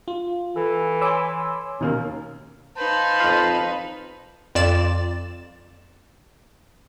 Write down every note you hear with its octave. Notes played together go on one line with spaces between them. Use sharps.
F4
E3 A4
C#5 G#5 B5 C6 D6 E6
D#2 B2 D#3 C#4 D#4 A#4
D#4 B4 C5 F5 A5
F2 F4
F2 F4 D5 A6 E7